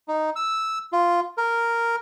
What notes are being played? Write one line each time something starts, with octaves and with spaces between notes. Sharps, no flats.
D#4
E6
F4
A#4